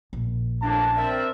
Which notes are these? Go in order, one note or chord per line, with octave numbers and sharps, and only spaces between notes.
A#1
F2 A2 A#3 D4 A5
C4 A#4 D5 E5